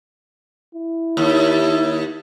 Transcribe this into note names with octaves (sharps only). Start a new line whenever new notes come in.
E4
D#2